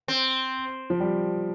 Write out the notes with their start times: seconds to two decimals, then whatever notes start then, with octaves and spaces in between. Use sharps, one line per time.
0.08 C4
0.90 F3
1.00 G3